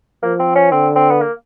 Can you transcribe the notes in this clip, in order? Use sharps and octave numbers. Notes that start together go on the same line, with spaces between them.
F3 A#3
C4
C#4
D3 C4
C4
B3
A#3